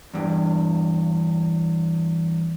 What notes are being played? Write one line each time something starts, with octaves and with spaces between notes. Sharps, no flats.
E2 G2